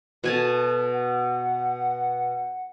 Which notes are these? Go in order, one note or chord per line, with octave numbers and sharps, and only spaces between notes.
B2 A4 G#5 A5
F#5